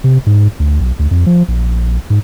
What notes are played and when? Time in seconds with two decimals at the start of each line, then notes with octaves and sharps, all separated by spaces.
0.04 C3
0.26 G#2
0.59 D2
0.80 B1
0.99 D2
1.11 F2
1.26 F3
1.48 A#1
2.10 G#2